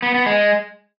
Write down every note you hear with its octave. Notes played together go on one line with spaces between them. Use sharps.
B3
B3
G#3